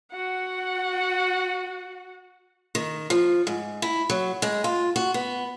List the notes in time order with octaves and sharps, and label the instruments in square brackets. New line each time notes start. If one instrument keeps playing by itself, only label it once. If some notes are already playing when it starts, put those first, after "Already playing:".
[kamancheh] F#4 F#5
[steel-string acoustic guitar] D#3
F3
G#2
E4
F#3
G#3
F4
F#4
B3